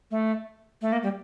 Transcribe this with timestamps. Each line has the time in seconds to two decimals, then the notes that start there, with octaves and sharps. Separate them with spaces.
0.11 A3
0.82 A3
0.92 A#3
1.03 G3